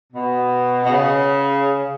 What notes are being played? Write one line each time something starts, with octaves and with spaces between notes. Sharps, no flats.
B2
B2
C#3